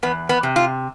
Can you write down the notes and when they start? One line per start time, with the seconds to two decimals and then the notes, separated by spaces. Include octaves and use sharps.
0.03 E2 B3
0.29 B3
0.43 C3
0.56 F4